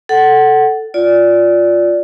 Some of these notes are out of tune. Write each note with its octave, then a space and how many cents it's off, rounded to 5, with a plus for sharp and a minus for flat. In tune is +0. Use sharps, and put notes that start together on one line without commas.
A4 +0 F#5 +20
F4 +10 D5 -10